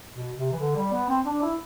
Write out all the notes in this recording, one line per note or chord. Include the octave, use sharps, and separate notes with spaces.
B2
C3
E3
D3
G3
B3
C4
D4
E4